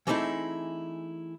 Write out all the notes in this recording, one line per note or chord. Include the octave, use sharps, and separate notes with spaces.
E3 A3 C4 D#4 E4 G#4